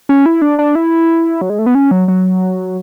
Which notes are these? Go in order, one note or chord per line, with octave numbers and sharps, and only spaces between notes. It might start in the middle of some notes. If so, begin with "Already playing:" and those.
C#4
E4
D4
D4
E4
F#3
G#3
A3
B3
C#4
F#3
F#3